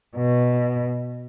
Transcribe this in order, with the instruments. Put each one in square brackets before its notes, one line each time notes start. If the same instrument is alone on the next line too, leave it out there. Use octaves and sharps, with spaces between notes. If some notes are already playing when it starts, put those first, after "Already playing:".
[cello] B2